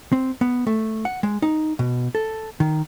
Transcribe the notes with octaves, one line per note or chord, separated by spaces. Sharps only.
C4
B3
A3
F#5
G#3
D#4
B2
A4
D#3